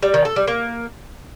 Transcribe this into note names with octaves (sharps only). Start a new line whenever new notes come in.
G3
D#3
A4
G3
A#3